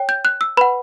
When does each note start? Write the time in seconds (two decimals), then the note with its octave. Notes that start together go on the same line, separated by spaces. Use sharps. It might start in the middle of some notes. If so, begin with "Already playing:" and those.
Already playing: C#5 G5
0.09 G6
0.25 F#6
0.41 E6
0.57 B4 F#5 B5